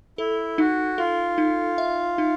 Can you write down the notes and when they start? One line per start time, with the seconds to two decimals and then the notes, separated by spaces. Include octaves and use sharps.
0.18 E4 A4
0.58 D#4 F#4
0.98 F4 A4
1.38 D#4
1.78 E5
2.18 D#4